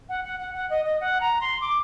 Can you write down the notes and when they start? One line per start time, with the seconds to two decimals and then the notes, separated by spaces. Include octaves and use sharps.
0.09 F#5
0.25 F#5
0.40 F#5
0.55 F#5
0.70 D#5
0.85 D#5
1.00 F#5
1.21 A#5
1.41 C6
1.61 D6